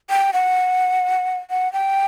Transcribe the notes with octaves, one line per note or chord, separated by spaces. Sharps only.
G5
F#5
F#5
G5